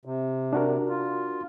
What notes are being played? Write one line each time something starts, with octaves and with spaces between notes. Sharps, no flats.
C3
D4 F#4 A#4
F4